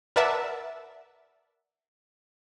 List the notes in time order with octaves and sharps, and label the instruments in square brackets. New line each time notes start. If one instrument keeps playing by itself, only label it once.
[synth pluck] A#4 B4 D5 E5 F#5 A5